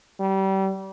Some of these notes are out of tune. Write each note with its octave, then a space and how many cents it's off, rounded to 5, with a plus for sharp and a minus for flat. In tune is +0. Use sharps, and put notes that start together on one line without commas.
G3 -30